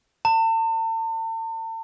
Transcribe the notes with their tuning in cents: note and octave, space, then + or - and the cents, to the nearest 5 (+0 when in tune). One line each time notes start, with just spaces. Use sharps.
A5 +40